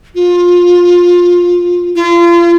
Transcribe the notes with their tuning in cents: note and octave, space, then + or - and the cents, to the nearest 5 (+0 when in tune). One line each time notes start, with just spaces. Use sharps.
F4 +15
F4 -35